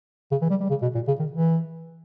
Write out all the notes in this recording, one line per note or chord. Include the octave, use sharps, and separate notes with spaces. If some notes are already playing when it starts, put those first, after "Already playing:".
C#3
E3
G3
G3
C#3
B2
A#2
C#3
D#3
E3